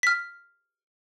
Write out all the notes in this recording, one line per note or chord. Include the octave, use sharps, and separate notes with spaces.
F6 B6